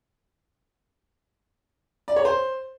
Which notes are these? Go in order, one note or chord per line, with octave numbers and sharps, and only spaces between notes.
D5
C#5
C5